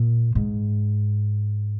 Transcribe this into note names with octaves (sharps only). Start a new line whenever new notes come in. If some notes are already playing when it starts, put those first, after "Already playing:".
Already playing: A#2
G#2